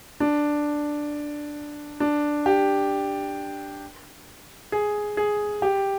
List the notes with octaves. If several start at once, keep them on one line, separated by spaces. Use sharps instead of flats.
D4
D4
G4
G#4
G#4
G4